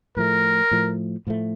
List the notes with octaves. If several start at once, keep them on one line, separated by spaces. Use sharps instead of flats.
A2 F3 A3 A#4
A2 F3 A3
A2 F3 A3